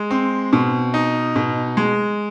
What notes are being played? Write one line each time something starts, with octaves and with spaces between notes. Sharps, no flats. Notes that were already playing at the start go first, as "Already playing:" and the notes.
Already playing: G#3
C4
B2
D#4
B2
G#3